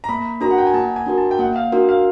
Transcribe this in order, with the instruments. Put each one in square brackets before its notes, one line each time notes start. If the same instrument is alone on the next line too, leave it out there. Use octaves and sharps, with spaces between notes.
[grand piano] A#5
[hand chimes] A#3 [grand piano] B5
[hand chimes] D4 F#4 A#4 [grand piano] A#5
[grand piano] F#5
G5
G#5
[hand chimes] A#3 [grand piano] A5
[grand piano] G#5
[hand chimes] D4 F#4 A#4
[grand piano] A5
G5
[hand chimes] A#3 [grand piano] F#5
[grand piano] F5
[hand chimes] D4 F#4 A#4
[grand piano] F5